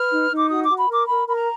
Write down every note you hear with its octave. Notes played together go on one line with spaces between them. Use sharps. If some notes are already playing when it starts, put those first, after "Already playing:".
Already playing: B4 F6
D#4
D#4
D6
F#4 D#6
F#4 D6
B5
A#4
D6
A#4 B5
A#4 B5
A#5